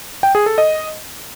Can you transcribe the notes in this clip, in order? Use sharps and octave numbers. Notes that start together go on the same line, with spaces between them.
G5
G#4
A4
D#5